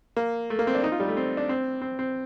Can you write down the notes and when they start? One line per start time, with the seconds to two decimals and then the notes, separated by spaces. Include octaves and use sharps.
0.17 A#3
0.50 A3
0.59 A#3
0.67 C4
0.75 D4
0.84 D#4
0.92 F4
1.00 G3
1.08 A3
1.17 C4
1.37 D4
1.49 C4
1.82 C4
1.99 C4